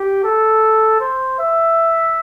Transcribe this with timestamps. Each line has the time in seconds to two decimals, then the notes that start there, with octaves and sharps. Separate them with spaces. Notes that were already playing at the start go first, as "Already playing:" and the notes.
Already playing: G4
0.24 A4
1.00 C5
1.40 E5